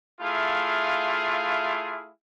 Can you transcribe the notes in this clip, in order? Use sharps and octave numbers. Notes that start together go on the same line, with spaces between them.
A3 E4 F4 G#4 F5